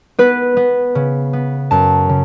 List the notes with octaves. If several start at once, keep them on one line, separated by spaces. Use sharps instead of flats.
B3 B4
B3
C#3
B3
F#2 A5
C#3